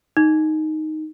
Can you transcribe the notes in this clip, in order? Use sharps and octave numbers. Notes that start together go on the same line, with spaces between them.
D#4